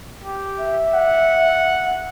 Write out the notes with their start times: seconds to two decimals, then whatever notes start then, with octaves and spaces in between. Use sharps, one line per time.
0.23 G4
0.59 E5
0.94 F#5